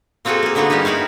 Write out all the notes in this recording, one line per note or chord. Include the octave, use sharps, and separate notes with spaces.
A#3 C4 F4 F#4 G#4 A4
A#3 G#4
D3 A#3 B3 D#4 F4 F#4
G3 G#3 C#4 D#4 G4
D#4 E4 F#4 F5